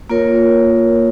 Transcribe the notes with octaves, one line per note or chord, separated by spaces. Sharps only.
A#3 F4 A#4 C#5